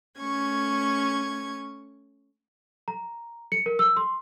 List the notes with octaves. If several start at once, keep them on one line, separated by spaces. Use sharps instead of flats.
A3 C#4 C#6 G#6
A#5
C#7
A#4
E6
C6